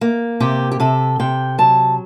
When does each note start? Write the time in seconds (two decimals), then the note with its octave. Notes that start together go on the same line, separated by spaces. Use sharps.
0.01 A#3
0.40 C3 G4
0.72 G4
0.80 C3 A4
1.20 C3 G5
1.58 F#3 A5